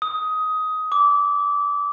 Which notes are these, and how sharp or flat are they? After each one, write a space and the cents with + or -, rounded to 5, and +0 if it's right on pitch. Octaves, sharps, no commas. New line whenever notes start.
D#6 +15
D6 -20